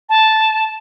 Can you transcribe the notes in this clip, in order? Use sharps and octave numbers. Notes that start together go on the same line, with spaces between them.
A5